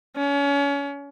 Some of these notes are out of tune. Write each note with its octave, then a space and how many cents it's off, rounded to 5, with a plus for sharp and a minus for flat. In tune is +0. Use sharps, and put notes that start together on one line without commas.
C#4 +30